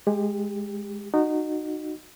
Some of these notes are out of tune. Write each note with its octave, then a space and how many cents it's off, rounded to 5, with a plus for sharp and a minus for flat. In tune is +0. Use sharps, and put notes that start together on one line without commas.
G#3 +0 G4 +25
D#4 -20 F#4 -5